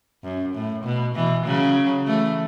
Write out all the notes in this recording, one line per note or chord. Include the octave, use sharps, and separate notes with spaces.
F#2
A2
B2
B2 E3
C#3 F#3
E3 A3